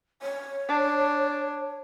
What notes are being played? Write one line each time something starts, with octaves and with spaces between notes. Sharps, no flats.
C#5
D4